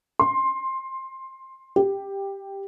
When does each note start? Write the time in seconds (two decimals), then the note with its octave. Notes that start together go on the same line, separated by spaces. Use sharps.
0.19 C6
1.76 G4